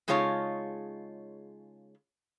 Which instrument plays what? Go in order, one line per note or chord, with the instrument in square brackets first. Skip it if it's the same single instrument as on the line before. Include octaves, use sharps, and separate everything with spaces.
[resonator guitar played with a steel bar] C#3 G#3 D#4 F4 C#5 A5